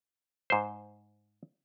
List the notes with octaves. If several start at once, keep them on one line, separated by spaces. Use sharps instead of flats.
G#2 C5